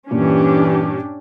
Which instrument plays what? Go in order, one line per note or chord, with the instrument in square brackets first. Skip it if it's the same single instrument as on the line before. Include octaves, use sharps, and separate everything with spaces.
[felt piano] G2 A#2 [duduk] E3 [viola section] C#4 D4 G4